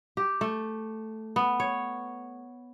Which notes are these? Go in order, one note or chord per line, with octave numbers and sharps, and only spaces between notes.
G4
A3
B3
C#5